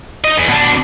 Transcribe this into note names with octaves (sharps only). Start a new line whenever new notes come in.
D#4 D#5
E2
B2 D4